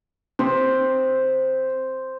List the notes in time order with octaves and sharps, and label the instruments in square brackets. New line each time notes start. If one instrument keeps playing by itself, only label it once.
[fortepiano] C3 [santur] C5 D#6